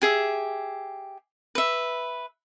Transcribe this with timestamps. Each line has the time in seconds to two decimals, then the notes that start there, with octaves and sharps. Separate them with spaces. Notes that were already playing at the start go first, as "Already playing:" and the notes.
0.02 G4 G#4 E5
1.55 B4 E5